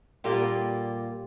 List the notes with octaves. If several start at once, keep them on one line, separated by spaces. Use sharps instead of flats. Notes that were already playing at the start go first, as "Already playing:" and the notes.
A#2 G3 A#3 G4